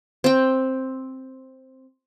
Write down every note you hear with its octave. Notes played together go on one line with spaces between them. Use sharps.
C4 G5